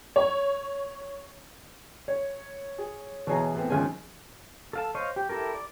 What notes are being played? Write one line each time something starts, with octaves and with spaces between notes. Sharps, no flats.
C#5
C#5
G#4
B2 E3 G#4 C#5 A#5
A2 B3 C4
D#2 C#3 F3 G#3 C#4 G#5
A4 F5 A5
C5 C#5 D#5 F5
G4
E4 G4 A4 A#4
D5